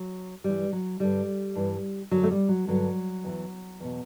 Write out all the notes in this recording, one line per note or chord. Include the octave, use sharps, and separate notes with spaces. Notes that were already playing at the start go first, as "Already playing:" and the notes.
Already playing: F#3
G2 E3 G3
F#3
G2 D3 G3
G2 E3
F#2 D3 F#3
A3
G3
F#3
G2 D3 F#3
E2 C#3 E3
E2 B2